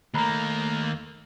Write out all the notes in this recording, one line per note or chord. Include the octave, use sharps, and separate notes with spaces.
D#2 A3 A#3 A#5 B5 F#6